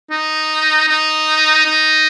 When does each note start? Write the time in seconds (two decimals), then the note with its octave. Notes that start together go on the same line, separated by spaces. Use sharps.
0.11 D#4
0.88 D#4
1.65 D#4